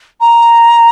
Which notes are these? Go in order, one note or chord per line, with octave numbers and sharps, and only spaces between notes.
A#5